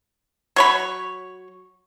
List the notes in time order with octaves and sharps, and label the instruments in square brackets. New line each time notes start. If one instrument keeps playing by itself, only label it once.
[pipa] F#3 C#5 B5